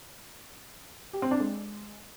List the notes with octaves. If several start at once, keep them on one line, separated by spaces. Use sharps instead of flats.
G4
C4
D4
G#3